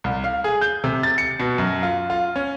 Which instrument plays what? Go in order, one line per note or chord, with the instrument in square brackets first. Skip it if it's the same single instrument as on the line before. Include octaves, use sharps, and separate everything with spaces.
[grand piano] C2
F5
G#4
G6
C3
A6
C#7
B2
F#2
F4
F4
C#4